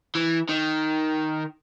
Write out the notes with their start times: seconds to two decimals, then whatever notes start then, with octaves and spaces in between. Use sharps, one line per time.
0.15 E3
0.49 D#3